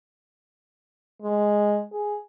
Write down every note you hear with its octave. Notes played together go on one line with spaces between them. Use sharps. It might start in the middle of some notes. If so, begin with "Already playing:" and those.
G#3
G#4